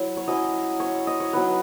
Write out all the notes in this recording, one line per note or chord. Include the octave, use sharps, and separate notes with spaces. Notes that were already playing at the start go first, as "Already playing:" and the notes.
Already playing: F#3 E4
C#5
F#3 C#4 E4 D#5
C#5
D#5
C#5
F#3 B3 D#4 B4